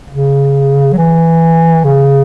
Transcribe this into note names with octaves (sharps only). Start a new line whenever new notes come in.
C#3
F#3
E3
C#3